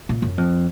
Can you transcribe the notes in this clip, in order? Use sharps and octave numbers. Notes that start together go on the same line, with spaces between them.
A#2
F#2
F2